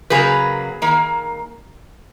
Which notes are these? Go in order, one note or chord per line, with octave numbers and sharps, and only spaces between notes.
C#3 F#3 A#3 G#4 B4
D#3 A#3